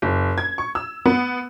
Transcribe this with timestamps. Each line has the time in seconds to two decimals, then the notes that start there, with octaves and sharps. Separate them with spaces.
0.02 F#1
0.38 G#6
0.58 C#6
0.75 E6
1.06 B3